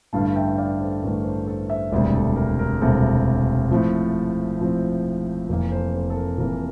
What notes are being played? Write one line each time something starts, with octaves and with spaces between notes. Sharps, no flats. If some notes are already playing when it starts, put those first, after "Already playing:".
A1 G2 D3 A3 F5 A5
E5 G5
D5 F5
A4 C5
A1 G2 D3 A3 A#4
A4 C5
A4 C5
C5 E5
E1 D2 C3 G3 A#4 D5
A4
A#4
A#4
E1 D2 C3 G3 A4
A2 F3 C4
A2 F3 C4
F1 F2 E3 A#3 A#4
A4 C5
A4 C5
A4
A#4
F1 F2 E3 A#3 A#4